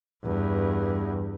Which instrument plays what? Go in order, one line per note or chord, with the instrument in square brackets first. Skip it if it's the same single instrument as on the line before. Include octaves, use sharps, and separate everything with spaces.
[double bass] E2 G2